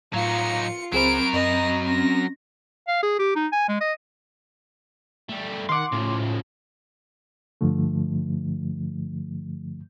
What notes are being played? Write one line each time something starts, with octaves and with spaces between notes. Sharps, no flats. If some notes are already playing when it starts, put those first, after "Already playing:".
A2 F#3 D#4 F4 F5 C#7
C#2 F#3 C4 G#4 A#4 C5 B5 D7
F#2 D#5
C4 C#4 A#6
F5
G#4
G4
D#4
G#5
G#3
D#5
G3 A3
D#3 F5 F#5 C6 D6
A2 C#3 F3
G2 D3 F3 A3